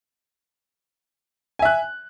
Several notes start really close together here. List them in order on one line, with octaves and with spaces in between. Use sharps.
G#5 E5 F#6